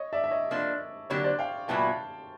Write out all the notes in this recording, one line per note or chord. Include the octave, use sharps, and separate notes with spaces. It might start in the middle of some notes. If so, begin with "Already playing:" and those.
Already playing: C#5 D#5
D5 E5
E5
C#5 D#5
F3 A#3 D4
D3 F#3 A#3 D4 G4 C#5
C5 D5
F5 G5
A#2 F#3 B3 E4 G5 A5